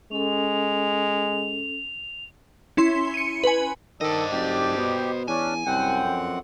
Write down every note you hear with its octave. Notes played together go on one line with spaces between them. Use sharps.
G#3 C#4 A4 F7
C#4 E4 C6
C#7 D#7
B4 G#5
D#3 D4 A4 C5 D#5
F#1 G4
B2
E2 C#4 D4 G#5
C2 F#2 C4 F#5 G5
F2